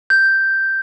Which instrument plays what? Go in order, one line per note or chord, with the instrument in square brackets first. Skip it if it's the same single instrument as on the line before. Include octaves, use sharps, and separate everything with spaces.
[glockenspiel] G6